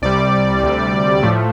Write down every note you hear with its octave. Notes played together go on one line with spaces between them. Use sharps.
C2 C3 G3 D5
D2 C3 G3
A2 F3 A3